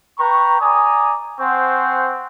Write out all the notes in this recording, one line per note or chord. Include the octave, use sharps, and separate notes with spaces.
B4 G5 A#5 C#6
D5 G#5 A#5 D#6
C4 C5 F#5 G#5 C#6